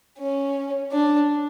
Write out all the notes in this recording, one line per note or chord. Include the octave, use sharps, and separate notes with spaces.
C#4
D4